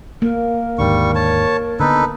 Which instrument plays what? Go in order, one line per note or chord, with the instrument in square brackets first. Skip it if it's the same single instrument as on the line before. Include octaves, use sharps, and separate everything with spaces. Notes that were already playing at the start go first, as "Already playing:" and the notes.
[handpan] A#3 [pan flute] A#4
[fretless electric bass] D#2 G#2 D3 [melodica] G3 C#6
[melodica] C#5 A5
[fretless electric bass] D3 B3 [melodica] D#4 A4 B4